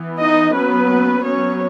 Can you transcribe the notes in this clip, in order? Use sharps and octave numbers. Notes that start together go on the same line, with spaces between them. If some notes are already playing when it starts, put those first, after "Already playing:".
Already playing: E3 B3
D#4 D#5
F#3 A#3 B3 C#4 B4
F#3 B3 C#4 C#5